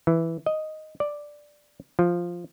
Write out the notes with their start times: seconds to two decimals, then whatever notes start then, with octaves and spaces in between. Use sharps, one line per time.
0.07 E3
0.46 D#5
1.00 D5
1.99 F3